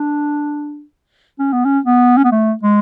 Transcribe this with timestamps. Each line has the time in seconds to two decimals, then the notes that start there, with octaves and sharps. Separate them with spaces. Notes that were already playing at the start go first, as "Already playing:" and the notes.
Already playing: D4
1.39 C#4
1.53 B3
1.65 C#4
1.85 B3
2.17 C#4
2.24 B3
2.32 A3
2.63 G#3